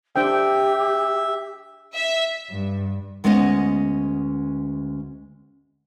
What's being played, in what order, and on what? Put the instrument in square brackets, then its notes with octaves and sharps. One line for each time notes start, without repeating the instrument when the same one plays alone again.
[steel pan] D4 C5 G5 [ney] G4 [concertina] E5
[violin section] E5
[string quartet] G2
[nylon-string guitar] D2 G#3 B3 C#4 C5 D#5